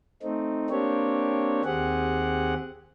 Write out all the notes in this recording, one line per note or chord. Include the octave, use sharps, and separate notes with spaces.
A3 C4 D#4
A#3 C4 D4 G4 C#5
D#2 C4 G4 G#4 F#5